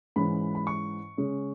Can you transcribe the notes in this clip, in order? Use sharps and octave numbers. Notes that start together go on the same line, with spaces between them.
G#2 E3 G#3 C#4 B5
B5
C#6
C#3 G#3 C#4